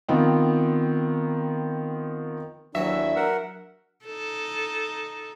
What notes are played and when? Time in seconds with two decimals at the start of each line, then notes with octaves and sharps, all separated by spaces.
0.08 D#3 F3 B3 C4
2.75 D#2 E3 F#3 D4 E5
3.16 A#4 F#5
4.06 D#4 A4